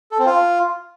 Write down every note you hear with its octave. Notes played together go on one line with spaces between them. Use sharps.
A4
C4
F4